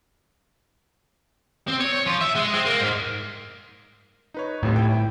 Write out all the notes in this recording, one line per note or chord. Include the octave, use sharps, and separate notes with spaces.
C4
C#5
C#5
F3
E5
G#3
C4
A#3
G#2
D#4 B4 C#5
G1 A2 C3
E4 G5